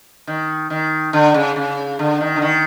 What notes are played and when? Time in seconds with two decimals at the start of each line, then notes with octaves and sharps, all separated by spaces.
0.27 D#3
0.70 D#3
1.13 D3
1.34 C#3
1.56 C#3
1.99 D3
2.21 D#3
2.36 D3
2.42 D#3